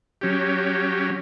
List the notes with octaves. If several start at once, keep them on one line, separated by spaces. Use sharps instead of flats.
F#3 C#4 G4